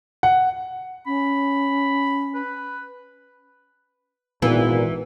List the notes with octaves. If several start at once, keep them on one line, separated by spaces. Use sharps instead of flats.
F#5
C#4 B5
B4
G#1 A#2 E3 B3